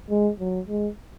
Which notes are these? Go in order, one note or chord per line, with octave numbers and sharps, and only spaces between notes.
G#3
F#3
G#3